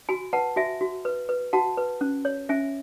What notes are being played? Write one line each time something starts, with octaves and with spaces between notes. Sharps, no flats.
F#4 G#5 B5
B4 F#5 A5
F#4 E5 G#5
F#4
B4
B4
F#4 F#5 A5
B4
C#4
C#5
C#4 E5 G#5